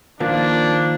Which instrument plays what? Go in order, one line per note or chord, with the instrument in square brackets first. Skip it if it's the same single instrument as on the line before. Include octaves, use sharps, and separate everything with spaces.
[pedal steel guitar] D#3 A#3 [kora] F3 [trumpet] D4